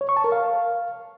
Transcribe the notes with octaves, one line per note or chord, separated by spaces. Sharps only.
C#5
C#6
A5
A#4
F5